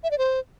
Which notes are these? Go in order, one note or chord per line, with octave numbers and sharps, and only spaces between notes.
E5
D5
C5